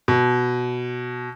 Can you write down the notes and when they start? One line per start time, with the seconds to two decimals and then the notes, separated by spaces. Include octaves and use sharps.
0.08 B2